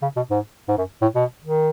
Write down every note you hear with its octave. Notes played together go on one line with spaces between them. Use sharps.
C#3
B2
G#2
G#2
F#2
A2
B2
D#3